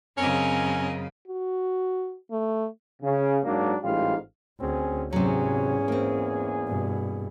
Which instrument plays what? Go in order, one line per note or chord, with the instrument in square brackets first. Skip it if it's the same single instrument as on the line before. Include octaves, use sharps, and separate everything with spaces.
[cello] F#2 C#3 [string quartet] C4 A#4 D#5 [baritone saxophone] C#4
[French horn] F#4
A3
[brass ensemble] C#3
G#2 F#3 A#3 D4
A1 G#2 G3 F4 F5
[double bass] D2 [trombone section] C4 C#4 G#4
[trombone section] E2 G#4 [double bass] G#2 C#4 [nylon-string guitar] C3 F#3
[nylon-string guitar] A#3 C4
[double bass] G2 B2